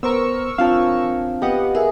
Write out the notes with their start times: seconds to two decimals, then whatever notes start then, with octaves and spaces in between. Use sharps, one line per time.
0.03 B3 A#4 C5 C#6 E6
0.58 F3 C4 D4 F4 C#5 F5 A5
1.42 B3 G4 D#5 F#5
1.75 G#4 A#4 E5